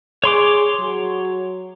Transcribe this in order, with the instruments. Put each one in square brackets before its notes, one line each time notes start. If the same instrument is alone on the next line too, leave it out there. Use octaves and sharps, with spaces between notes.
[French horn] G#4 [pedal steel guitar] C#5 C6 D6
[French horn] F#3